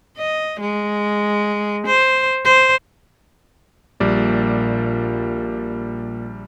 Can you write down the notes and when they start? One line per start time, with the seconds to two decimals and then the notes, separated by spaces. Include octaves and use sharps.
0.17 D#5
0.60 G#3
1.87 C5
2.45 C5
4.00 A#1 A#2 G3 D5